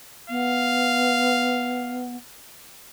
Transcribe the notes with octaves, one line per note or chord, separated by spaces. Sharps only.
B3 F5